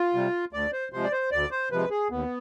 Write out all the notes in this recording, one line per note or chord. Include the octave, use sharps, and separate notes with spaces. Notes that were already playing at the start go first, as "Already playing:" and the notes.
Already playing: F4
C3 G3
D2 D5
C5
C3 F3 G#3 C5
D5
C5
D2 D5
C5
C3 F3 G#3 B4
G#4
D#2 B3